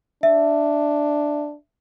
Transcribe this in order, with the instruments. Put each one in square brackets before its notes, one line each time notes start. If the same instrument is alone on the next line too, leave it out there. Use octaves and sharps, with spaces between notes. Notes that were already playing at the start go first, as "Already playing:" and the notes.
[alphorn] D4 [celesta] E5